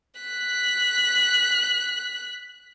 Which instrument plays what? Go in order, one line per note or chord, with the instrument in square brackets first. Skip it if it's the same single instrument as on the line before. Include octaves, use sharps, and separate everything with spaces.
[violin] F#6 B6